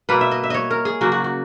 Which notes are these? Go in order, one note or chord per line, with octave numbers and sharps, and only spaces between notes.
B2 A#3 B4
E5
D#5
E5
C#5 D#5
A#4
G#4
C#3 F#3 A#3 F#4
F#4
F#4